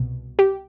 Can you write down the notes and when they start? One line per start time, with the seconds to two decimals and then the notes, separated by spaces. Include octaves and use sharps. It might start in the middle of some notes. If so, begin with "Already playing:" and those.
Already playing: C2 B2
0.39 G4